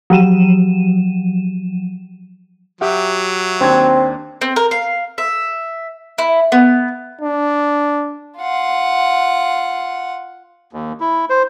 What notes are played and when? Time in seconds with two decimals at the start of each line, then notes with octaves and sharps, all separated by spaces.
0.10 F3 F#3 D#7 E7
2.81 F#3 G4 E5 F#5
3.61 D#2 C4 D4 G#6
4.41 C4
4.56 A#4
4.71 F5
5.18 E5
6.18 E4
6.52 B3
7.21 D4
8.38 F4 F#5
10.73 D#2
11.00 E4
11.30 C5